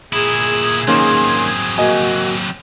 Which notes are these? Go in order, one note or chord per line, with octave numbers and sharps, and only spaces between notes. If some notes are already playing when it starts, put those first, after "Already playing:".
A#2 E4 G#4
D#3 F#3 A#3 C4 C#4 C6
A#3 F#4 D#5 G#5